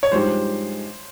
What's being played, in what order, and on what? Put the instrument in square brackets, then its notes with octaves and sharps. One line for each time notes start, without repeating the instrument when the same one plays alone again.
[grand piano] C#5
[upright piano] G2 F3 G#3 D#4 G4 [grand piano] C5